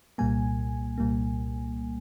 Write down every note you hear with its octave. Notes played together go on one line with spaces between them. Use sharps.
C2 A#2 G3 A#3 G#5
C2 A#2 G3 A#3